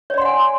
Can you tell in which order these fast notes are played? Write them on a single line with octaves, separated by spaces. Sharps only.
C#5 D5 C6 F#5 G#5